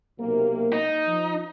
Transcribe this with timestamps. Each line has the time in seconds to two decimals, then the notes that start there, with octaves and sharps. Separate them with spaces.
0.19 B1 C3 A#3
0.73 D#4
1.07 F3